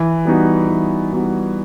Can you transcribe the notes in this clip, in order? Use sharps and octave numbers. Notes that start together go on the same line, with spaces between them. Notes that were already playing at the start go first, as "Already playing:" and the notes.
Already playing: E3
G3 B3 D#4 F#4
E3
G3 B3 D#4 F#4